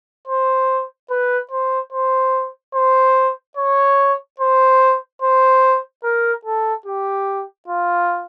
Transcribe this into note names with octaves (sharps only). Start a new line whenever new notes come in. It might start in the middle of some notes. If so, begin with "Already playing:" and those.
C5
B4
C5
C5
C5
C#5
C5
C5
A#4
A4
G4
F4